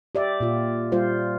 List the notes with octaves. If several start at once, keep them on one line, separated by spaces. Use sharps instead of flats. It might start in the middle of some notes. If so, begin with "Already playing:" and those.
G4 D5 E5
A#2 F4
G3 F4 C5